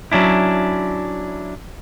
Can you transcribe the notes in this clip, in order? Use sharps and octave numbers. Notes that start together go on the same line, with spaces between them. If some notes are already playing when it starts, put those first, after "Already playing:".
F#3 C#4 D4 E4